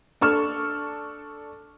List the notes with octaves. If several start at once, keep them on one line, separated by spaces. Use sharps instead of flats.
D4 A4 C#6 F6 E7